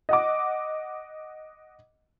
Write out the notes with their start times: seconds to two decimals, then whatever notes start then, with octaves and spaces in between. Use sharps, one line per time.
0.09 D#5 F#5 D6